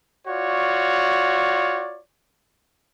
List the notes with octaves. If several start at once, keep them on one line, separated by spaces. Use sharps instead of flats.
F4 F#4 C#5 D5